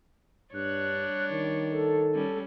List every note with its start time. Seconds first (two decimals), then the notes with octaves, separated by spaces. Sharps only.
0.54 G2 G3 D4 C#5 F#6
1.32 D#3
1.71 A4
2.14 G3 C#4